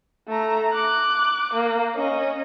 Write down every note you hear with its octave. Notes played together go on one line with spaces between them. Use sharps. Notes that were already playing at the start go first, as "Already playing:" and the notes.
A3 A#5
D6 F#6
A#3
C#4 D#5